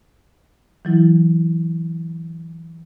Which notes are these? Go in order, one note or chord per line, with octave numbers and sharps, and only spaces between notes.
E3 F#3 E4